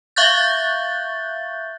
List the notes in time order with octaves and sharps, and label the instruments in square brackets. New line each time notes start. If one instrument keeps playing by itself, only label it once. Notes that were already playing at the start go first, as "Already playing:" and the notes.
[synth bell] E5 F5 C#6 F#6 G6 A6